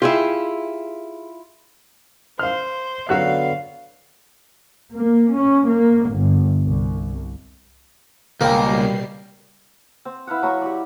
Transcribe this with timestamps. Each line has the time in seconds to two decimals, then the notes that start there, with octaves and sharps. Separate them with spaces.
0.02 E4 F4 G4 G#4 E5
2.39 C5 F5 F6
3.09 D3 F#3 B3 F#4 F5 F#6
4.97 A#3
5.37 C#4
5.71 A#3
6.12 G1
6.64 C2
8.41 C#2 B2 G3 A#3 A#4 G5 C7
10.05 C4
10.27 E4 B4 F5 F#5
10.42 F#3 A#5 B5 C#6
10.62 G4 D5